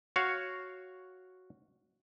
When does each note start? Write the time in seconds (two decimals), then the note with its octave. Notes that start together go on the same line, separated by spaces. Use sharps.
0.16 F#4 C#5 F5